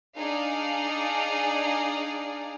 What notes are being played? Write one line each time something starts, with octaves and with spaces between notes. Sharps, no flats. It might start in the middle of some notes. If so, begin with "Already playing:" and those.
D4 D#4 G#4 D5 F5